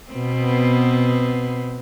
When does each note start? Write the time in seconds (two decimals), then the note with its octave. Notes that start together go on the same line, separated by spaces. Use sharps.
0.11 B2 B3 C4